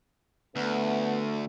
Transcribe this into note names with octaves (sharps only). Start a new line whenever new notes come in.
D2 A3 B3